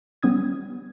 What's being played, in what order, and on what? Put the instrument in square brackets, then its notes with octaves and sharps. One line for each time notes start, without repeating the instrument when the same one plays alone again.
[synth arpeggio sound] G3 B3 C#4 D#6 G#6